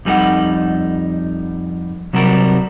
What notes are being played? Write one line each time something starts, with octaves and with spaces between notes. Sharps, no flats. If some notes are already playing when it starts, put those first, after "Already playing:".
F2 G3 D#4 G#4 A4 F#5
C3 F#3 G3 A4 A#4